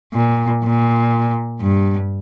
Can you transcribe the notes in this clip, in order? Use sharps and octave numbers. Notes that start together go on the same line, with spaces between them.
A#2
A#2
G2